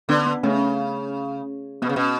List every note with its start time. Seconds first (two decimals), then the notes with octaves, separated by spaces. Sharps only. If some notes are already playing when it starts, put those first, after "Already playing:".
0.09 D3 B3 D4
0.26 B3 D4
0.43 C#3 A3 C#4
1.82 B2 B3
1.89 C#3
1.96 B2